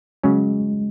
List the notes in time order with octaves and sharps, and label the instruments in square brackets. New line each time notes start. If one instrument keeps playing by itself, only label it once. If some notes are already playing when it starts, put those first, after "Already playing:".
[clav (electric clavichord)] C#3 F#3 C#4 [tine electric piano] G#3